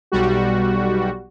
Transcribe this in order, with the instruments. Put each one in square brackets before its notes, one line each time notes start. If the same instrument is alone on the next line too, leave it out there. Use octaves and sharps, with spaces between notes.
[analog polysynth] B1 G3 F#4